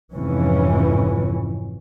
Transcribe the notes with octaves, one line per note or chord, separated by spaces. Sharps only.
F1 F2 G#2 E3 C#4